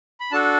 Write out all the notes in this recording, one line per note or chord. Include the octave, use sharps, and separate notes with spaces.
B5
D4 F#4 A4 A5